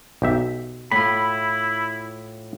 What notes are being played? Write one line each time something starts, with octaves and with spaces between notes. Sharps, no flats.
B1 G4 E5
A2 E4 F4 B5